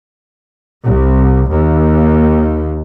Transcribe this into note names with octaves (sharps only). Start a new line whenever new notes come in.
C2
D#2